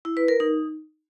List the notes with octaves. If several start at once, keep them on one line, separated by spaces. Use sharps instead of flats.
E4
B4
A#4
D#4